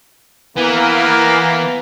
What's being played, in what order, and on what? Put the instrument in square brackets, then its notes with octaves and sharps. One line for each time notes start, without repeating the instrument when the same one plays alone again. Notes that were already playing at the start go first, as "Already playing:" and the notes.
[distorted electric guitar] E3 [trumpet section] A#3 [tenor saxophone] B3